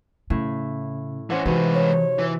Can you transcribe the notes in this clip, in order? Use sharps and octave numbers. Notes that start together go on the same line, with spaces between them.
A2 C#3 E4
E3 C#4 C5 F#5 G#5
C3 E3 G#3 D#4 F#4 B4
C#5
E3